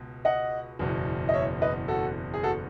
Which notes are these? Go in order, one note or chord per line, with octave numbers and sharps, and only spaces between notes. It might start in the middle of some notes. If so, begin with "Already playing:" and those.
Already playing: C#2 B2
D#5 F#5
F#1 E2 B2
D#5
C#5 E5
B4 D#5
F#4 A4
G#4
F#4 A4